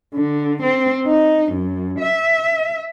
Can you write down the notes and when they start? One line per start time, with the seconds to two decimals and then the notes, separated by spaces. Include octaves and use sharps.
0.15 D3
0.62 C4
1.07 D#4
1.52 F#2
1.99 E5